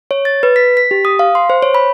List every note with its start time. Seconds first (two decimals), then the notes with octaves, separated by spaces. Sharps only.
0.11 C#5
0.25 A6
0.43 B4
0.56 B6
0.77 B6
0.91 G4
1.05 D#6
1.19 F5
1.35 C6
1.50 C5
1.62 C#5
1.75 B5